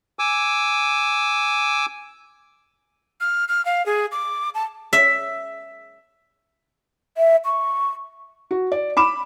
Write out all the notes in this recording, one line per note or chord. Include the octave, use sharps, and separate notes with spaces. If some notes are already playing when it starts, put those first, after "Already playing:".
G#5 D6 E6
F6
F6
F5
G#4
D6
A5
E5
E5
C#6
F#4
D5
B5 D6 E7